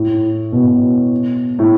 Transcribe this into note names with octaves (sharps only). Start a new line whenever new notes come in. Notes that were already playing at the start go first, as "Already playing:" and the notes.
Already playing: A2
B2
A2